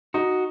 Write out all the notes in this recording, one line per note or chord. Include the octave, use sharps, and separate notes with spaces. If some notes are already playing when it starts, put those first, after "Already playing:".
D#4 F#4